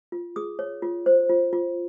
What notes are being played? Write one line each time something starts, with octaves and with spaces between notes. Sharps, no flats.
F4
G#4 D#6
C#5
F4
C5
F4
F4